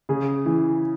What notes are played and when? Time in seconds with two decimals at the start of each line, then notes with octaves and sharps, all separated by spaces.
0.09 C#3 G#4
0.46 E3